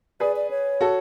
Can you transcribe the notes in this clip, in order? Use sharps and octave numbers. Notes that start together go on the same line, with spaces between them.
G#4 B4 D5
D5
C#5
F#4 A4